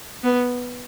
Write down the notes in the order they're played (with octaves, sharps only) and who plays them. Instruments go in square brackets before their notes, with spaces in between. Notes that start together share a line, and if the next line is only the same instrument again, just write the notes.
[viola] B3